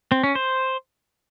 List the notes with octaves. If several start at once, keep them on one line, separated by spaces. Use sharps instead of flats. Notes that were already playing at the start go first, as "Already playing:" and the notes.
C4
C#4
C5